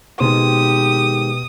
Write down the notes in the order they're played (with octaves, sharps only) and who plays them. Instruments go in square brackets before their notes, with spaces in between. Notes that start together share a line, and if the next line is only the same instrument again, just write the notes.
[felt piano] B2 [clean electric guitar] D#3 G#3 C5 [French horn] G4 [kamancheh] D#6